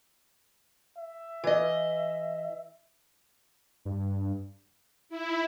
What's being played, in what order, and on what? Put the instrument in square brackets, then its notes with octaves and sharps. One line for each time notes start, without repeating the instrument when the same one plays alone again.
[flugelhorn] E5
[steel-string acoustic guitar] E3 D#5
[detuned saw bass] G2
[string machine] E4